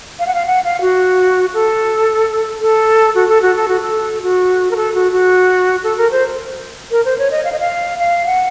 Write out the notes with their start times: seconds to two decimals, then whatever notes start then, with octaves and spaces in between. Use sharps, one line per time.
0.19 F5
0.27 F#5
0.34 F5
0.46 F#5
0.64 F5
0.81 F#4
1.54 A4
2.62 A4
3.15 F#4
3.29 A4
3.42 F#4
3.56 A4
3.68 F#4
3.81 A4
4.22 F#4
4.71 A#4
4.76 A4
4.94 F#4
5.12 F#4
5.84 A4
5.98 A#4
6.11 C5
6.91 A#4
7.05 C5
7.18 C#5
7.31 D#5
7.45 F5
7.52 D#5
7.60 F5
7.99 F5
8.26 F#5